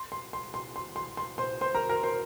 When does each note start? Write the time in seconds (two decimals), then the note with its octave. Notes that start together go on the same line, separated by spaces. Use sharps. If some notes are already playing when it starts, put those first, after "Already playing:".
Already playing: C6
0.12 C6
0.33 C6
0.54 C6
0.76 C6
0.96 C6
1.17 C6
1.38 C5 C6
1.61 C5 C6
1.75 A#4 A#5
1.89 A#4 A#5
2.03 C5 C6